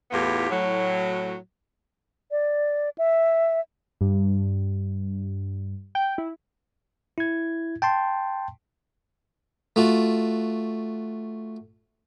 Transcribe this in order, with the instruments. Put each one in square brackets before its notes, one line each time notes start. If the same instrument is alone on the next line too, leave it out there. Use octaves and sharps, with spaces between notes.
[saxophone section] E2 A2 B3 F4 G4
A2 F#3
[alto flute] D5
E5
[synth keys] G2
G5
E4
[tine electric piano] E4 G#6
G5 A5 C6
[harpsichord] A3 F4 F#4